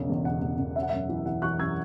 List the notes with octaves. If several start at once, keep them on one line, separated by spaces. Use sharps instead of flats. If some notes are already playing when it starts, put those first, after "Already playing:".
Already playing: E1 B1 C#3
E2
E1 F#5
E2
E1
C#4 E5
F#5
F#2 E5
E3
E3 F#5
E3 C#6 F#6
F#2 E6 G#6